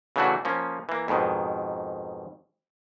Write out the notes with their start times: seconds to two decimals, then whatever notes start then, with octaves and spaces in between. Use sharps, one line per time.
0.16 C#3 E3 F#3 A3 D4 F#4
0.45 F3 A#3 C#4
0.89 E3 A#3
1.08 F2 G#2 B2 D#3